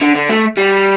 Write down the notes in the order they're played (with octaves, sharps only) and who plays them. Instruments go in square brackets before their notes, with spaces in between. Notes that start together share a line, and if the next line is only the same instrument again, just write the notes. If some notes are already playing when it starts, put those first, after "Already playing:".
[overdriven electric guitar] D3
D3
A3
G3